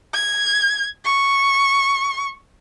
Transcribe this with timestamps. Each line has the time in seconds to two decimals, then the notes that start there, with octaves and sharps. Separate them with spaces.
0.14 G#6
1.05 C#6